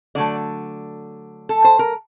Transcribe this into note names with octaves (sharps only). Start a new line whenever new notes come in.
D3 F#3 A3 D5
A4
C5
A#4